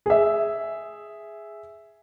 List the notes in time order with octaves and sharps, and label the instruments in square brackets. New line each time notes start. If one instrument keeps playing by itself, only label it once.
[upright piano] G#4 E5